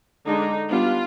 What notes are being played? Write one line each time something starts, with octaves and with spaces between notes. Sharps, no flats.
D3 G#3 D4 D#4
G3 B3 D4 F4